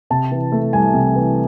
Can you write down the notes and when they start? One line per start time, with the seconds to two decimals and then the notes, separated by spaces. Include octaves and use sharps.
0.10 C3 A5
0.31 E3
0.52 A3
0.73 C2 G#5
0.94 C3
1.15 E3